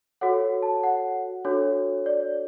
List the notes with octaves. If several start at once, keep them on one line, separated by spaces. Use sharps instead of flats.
F#4 A4 C#5 F#5
A5
F#5
D4 F#4 A4 C#5
D5